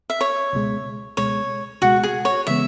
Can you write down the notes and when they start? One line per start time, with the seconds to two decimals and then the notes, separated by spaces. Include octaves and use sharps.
0.10 E5
0.21 C#5
0.53 C#2 B2 G#3
1.17 C#2 B2 G#3 C#5
1.82 C#2 B2 G#3 F#4
2.03 G#4
2.25 C#5
2.47 C#3 E3 G#3 B3 E5